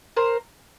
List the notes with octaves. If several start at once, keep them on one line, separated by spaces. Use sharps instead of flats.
A#4 C5